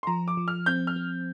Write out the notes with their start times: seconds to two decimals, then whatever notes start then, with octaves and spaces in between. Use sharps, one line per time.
0.03 C6
0.07 F3 A#5
0.28 D6
0.37 F3
0.48 F6
0.66 C4 G6
0.87 F6
0.96 C4